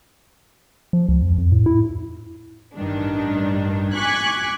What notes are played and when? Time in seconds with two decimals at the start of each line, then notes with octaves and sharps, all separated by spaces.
0.93 F3
1.09 C#2
1.22 F2
1.38 F2
1.52 A2
1.66 E4
2.75 A1 G2 D#3 D4
3.93 G#5 C#6 D6 F#6 G#6 B6